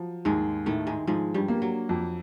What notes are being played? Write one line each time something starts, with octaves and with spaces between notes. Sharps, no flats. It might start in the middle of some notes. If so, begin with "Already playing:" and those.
Already playing: F3 F#3
D#2 G#2 G#3
A2 D#3 A3
G#2 G#3
G#2 F3 G#3
G2 G3
A#3
F#3
F2